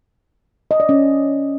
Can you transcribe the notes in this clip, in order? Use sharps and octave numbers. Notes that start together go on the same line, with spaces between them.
D#5
D5
C#4